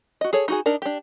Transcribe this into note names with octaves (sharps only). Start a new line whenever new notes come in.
F#4 D#5
G#4 A4 C#5
D#4 F#4 G#4
D4 D#4 A#4
D4 G4